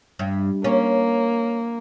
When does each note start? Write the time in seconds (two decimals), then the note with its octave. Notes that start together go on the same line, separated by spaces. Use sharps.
0.19 G2
0.64 A#3 C#4